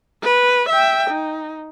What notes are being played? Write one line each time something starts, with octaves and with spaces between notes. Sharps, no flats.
B4
E5 G5
D#4